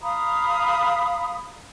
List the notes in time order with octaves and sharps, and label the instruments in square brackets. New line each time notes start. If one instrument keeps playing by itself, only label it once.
[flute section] F5 A#5 B5 D#6